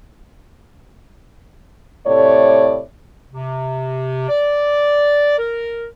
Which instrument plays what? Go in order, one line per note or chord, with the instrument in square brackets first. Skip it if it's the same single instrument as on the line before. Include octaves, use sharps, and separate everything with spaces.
[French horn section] A2 C3 A3 C#5 D5
[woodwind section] C3
D5
A#4